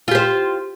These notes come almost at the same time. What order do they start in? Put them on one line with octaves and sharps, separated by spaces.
F4 G4 C5